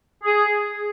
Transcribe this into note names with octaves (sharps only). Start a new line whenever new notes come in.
G#4